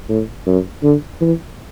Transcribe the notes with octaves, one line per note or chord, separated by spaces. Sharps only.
A2
F#2
D3
E3